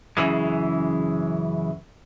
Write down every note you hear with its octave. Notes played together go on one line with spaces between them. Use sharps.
F#2 C#3 E3 G#3